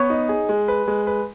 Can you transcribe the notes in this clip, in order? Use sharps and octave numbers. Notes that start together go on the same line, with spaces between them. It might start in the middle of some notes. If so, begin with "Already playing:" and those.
Already playing: B3 C#5
D#4
G#4
G#3
B4
G#3
B4